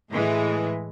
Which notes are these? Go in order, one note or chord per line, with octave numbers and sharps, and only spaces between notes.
A2 E3 G#3